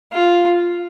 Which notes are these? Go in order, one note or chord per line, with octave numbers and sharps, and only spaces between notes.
F4